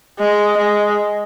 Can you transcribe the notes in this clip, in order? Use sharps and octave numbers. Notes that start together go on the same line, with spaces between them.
G#3
G#3